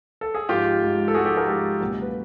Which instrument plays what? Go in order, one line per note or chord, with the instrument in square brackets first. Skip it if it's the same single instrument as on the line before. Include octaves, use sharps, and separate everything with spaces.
[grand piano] A4
G#4
G#2 F3 G#3 F4 G4
G#2 F3 G#3
A4
G#2 F3 G#3 F#4 G#4
G4 A4
G#4 A#4
G#2 F3 G#3 G4 A4
C#2 B2 F#3 A#3
B4